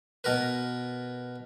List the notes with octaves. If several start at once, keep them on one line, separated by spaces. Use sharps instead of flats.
B2 A#4 B4